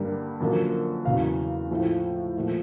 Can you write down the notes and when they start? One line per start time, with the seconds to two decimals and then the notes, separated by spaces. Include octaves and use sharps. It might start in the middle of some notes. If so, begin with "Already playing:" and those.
Already playing: G2 D3 G3 A#3
0.40 F#2 D3 F3 A#3
1.05 E2 C#3 F#3 F5
1.71 A2 F3 A3
2.36 A#2 F3 A3